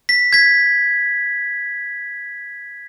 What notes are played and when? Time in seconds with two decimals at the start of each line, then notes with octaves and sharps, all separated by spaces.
0.09 B6
0.33 G#6 B6